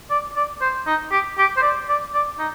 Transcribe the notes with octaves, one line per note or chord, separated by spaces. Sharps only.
D5
D5
C5
D#4
G4
G4
C5
D5
D5
D5
D#4